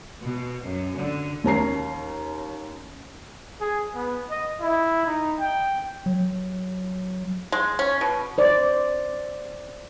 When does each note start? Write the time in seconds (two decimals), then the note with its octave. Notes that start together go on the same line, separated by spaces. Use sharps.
0.23 B2
0.64 F#2
0.97 D3
1.44 D#2 C#4 A#5 C7
3.61 G#4
3.95 B3
4.30 D#5
4.61 E4
5.06 D#4
5.39 G5
6.06 F#3
7.52 G#3
7.79 C#4
8.01 B2
8.38 C5 D5